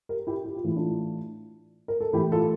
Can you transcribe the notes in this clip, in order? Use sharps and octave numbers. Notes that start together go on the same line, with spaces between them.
G4 A#4
E4 G4
G4
F4
A2 E3 E4
D4 F4
A#4
A4
A2 E3 E4 G4
F4 A4